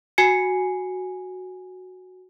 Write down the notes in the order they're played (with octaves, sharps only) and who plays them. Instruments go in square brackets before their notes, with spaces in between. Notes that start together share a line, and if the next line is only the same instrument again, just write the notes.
[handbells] F#4 G#5 C7 C#7